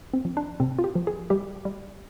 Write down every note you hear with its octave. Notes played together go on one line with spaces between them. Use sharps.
C4
F3
D4
C3 C4
F4
G4
F3
G#4
G3 G4
G3